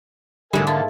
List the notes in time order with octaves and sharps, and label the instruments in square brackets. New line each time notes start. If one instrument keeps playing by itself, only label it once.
[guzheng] G#2 A3 [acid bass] D3 [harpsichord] G3 [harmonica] A#4 E5 G#5
[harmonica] A#3 A5 [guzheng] E4 F4